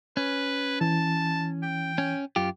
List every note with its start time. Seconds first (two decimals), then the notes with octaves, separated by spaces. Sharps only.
0.17 C#4 B4
0.81 E3 A5
1.63 G5
1.98 C#4
2.36 F#2 F4 G4